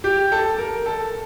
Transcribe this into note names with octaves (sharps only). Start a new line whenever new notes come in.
G4
A4
A#4
A4